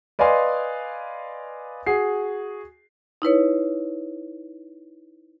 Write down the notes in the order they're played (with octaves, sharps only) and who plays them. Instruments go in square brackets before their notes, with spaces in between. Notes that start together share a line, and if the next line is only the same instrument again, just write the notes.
[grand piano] B4 D5 D#5 F5 G#5 C6
F#4 G#4 C7
[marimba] D#4 E4 B4 C#5